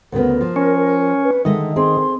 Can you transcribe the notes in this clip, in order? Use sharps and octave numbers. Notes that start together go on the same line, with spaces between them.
D2 C#3 B3 A#4
F3
C#4
B4
D3 D#3 G#3 D#5 E5
C4 G#4 A#4 C6